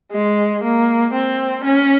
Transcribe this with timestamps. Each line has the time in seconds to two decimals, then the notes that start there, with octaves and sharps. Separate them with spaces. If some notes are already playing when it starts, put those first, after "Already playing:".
0.12 G#3
0.63 A#3
1.13 C4
1.64 C#4